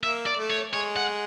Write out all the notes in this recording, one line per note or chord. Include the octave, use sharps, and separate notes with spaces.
A#3 E5
D5
A3
C#5
G#3 C#5
F#5